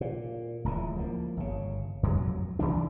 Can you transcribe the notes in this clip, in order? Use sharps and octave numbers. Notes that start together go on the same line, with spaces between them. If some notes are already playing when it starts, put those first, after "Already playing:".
A#2
D1 C#2 E3
F3 A#3
G1 C#3
F2 F#3
G#1 D#2 E3 D4